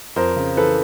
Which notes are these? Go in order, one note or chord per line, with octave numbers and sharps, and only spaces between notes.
F2 A#4 C5
C#3
E3 A4 B4